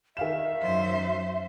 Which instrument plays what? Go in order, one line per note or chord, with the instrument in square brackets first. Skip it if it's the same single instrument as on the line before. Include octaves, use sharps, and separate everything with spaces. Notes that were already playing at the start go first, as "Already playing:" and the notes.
[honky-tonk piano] D#3 F5 E7 [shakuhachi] E5
[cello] F#2 C5